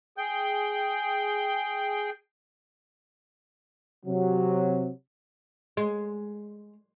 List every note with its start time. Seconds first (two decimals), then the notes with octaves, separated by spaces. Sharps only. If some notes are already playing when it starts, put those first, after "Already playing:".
0.18 G#4 G5 G6
4.06 C3 F#3
5.77 G#3